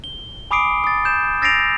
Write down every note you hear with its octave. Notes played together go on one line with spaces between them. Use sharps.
G7
G#5 B5 D6 D#6 C7 D7
D#6 A6
G6 E7
E6 A6 A#6 C7 D7 F7